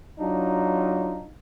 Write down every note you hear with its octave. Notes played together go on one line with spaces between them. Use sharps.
F#3 D4 D#4 F4